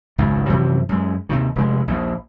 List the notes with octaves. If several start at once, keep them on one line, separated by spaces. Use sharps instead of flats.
G#1 C#2 F#2 D#3
F#2 C3 E3 F3
F#2 G#3
D#2 C3 D#3
F1 G#3
A#1 D#2